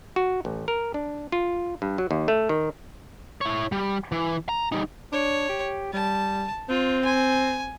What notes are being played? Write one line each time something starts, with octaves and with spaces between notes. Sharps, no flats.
F#4
A1
A#4
D4
F4
G2
F#3
D#2
A3
D#3
E4 C#5
G3
E3
A#5
G3 D#4
D4 C#5
G4
G3 A5
C4 F4
G#5